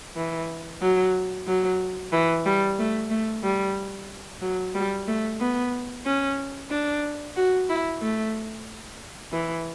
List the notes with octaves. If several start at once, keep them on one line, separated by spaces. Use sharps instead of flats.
E3
F#3
F#3
E3
G3
A3
A3
G3
F#3
G3
A3
B3
C#4
D4
F#4
E4
A3
E3